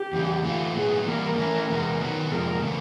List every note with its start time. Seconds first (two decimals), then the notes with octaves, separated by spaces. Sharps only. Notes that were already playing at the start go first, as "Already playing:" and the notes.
Already playing: G4
0.13 E2 C#3 E3
0.44 E3 A3 D4 F4
0.75 A2 F#3 B3 G#4
1.06 E3 G3 A#3 A#4
1.37 E3 A3 C#4 E4 A#4
1.69 E2 C3 E3 G#3 B3
2.00 D#3 F#3 B3
2.31 F2 C3 F3 G#3 A#4
2.62 C#3 E3 A3